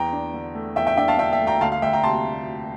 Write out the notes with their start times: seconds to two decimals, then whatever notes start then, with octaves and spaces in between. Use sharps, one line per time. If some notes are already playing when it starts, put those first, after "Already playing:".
Already playing: E2 G5 A#5
0.13 D4
0.34 D3
0.55 A3
0.76 E2 E5 G5
0.87 E5 G5
0.97 D4 E5 G5
1.08 F5 A5
1.19 D3 E5 G5
1.33 E5 G5
1.40 A3
1.47 G5 A#5
1.61 D2 F5 A5
1.72 F5
1.82 D2 E5 G5
1.93 G5 A#5
2.03 C3 A5 C6